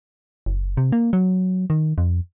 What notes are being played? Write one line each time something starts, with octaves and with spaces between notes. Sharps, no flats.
F#1
C3
A#3
F#3
D#3
F2